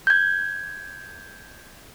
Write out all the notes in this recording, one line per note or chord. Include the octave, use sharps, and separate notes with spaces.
G6 G#6